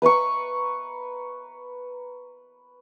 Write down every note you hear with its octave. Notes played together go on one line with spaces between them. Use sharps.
B4 A#5 B5 C#6